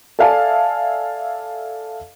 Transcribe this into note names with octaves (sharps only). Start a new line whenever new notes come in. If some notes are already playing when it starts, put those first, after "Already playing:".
A4 D5 E5 F5 G#5 A5